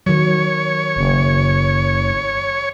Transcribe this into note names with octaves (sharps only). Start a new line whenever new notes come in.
D#3 F#3 C#5
F#1